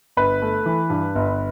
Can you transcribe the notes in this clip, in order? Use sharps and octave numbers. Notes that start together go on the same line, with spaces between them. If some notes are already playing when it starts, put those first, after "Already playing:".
G1 B4
A3
E3
G2
G1